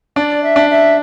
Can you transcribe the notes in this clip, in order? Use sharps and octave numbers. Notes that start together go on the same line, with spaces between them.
D4 D5
E5
D4
E5